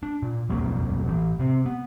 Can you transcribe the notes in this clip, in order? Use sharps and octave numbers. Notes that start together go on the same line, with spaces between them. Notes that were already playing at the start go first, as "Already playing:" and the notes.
D4
A#2
D#1 B1 F2 A#3
A2 E3
C3 C4
B3